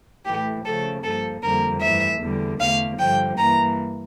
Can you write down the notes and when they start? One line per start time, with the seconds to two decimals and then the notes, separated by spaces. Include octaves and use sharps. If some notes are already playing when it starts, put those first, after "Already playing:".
0.26 A2 E3 A3 G4
0.65 C#3 F3 A3 A4
1.04 G2 F3 A#3 A4
1.43 F2 D3 G3 A#3 A#4
1.82 G2 E3 A3 E5
2.21 E2 D3 G3
2.60 E2 D3 A3 F5
2.99 G2 D3 F3 G5
3.38 G2 E3 A#3 A#5